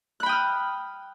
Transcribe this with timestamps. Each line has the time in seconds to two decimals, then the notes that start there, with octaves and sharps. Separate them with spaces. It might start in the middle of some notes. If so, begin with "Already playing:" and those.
0.20 F#6
0.23 B5
0.26 G5
0.29 D#6
0.32 F6